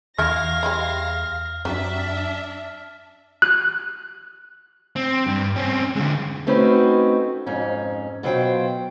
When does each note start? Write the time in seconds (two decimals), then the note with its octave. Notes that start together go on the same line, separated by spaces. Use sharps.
0.18 E2 D4 E4 F#4 F5 F6 A#6
0.63 G3 G#3 E4
1.65 F#2 F#3 D4 G4 E5
3.42 F#6
4.96 C4
5.27 G2
5.56 C4 C#4
5.96 D3 G#3
6.47 A3 C4 C#4 D#4 F#4 B4
7.46 F2 G#2 C#4
8.23 B2 F#3 F4 C5 C#5 G5